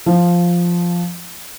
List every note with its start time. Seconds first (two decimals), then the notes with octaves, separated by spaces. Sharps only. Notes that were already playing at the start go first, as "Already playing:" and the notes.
0.06 F3